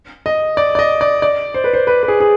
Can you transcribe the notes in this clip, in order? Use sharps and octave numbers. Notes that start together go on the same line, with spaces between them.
D#5
D5
D5
D#5
D5
D5
C5
B4
C5
B4
B4
G#4
G#4